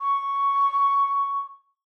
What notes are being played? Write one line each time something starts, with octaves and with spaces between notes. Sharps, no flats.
C#6